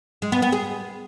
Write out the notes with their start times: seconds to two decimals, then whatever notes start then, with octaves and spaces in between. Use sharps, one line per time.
0.22 G#3
0.32 B3
0.42 B3
0.52 G#4